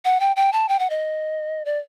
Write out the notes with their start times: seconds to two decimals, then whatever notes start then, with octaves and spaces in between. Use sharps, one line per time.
0.05 F#5
0.20 G5
0.36 G5
0.53 A5
0.69 G5
0.79 F#5
0.90 D#5
1.65 D5